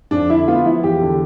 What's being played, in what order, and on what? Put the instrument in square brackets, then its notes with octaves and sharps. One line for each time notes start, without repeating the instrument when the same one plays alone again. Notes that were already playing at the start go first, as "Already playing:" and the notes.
[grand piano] F2 D4
D3 E4
B3 F4
F3 E4
E2 G4
D3